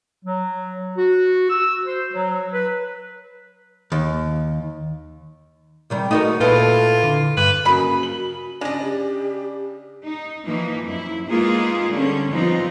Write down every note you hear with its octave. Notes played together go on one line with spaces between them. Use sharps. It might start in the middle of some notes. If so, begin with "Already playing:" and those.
F#3
F#4
E6
C5
F#3
B4
D#2
C3 D#3 G3
A3 D#4 F#4 A#4
A#2 E4 F4 A4 B4
D3
G2 B4
C#3 F#3 A#3 F#4 D#5 B5
F#7
C#3 G#3 D4 D5 D#5
G4
D#4
E3 F3 A#3 D#4
F#2 E4
G#3 A#3 B3 D#4 F4 G#4
D3 G3 C#4
F3 G3 B3 C4 D#4 F4